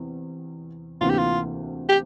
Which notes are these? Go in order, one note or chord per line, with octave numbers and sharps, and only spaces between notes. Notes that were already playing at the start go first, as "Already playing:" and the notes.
Already playing: E2 C3
D2 C3 E3 A#3 F4
G4
F4
G4